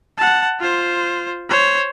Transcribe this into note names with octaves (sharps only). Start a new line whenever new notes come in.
F#5 A5
F4 C5
C5 C#5